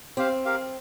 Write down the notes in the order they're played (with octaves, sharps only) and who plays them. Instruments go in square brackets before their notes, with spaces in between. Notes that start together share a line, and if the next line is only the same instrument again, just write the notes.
[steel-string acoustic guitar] C4 [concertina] G4 C5 F5
[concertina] G4 A#4 F5